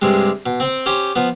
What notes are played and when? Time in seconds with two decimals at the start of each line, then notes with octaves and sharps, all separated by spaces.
0.02 G2 C3 G3 G#3
0.46 B2
0.60 C4 C5 G5
0.86 C#4 G4 C5
1.16 F3 B3